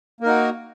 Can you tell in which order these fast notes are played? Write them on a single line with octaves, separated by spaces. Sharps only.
A#3 A#4 D#4 F#4